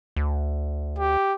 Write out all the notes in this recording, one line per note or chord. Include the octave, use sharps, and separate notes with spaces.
D2
G4